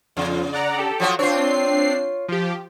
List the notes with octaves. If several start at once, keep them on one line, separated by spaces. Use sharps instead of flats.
F2 C#3 F4
D5 F#5 A#5
G4 A4
F3 F#3 F#4
C4 D4 F4 C#5 C7
F3 G4